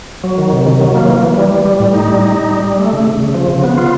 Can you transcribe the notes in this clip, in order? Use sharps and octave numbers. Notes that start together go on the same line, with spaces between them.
F#3
D#3
C3
D#3
F#3
A#3
E3
E3
G3
G3
G3
A2
D#4
G3
D#4
D#4
G3
G3
A3
C#3
C#3
C#3
F3
C#3
B3
F4